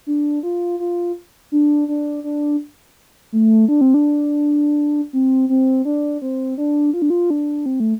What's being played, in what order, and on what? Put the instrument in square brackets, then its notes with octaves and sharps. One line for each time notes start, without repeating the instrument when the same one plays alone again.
[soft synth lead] D4
F4
F4
D4
D4
D4
A3
D4
C4
D4
C4
C4
D4
C4
D4
F4
D4
F4
D4
C4
A3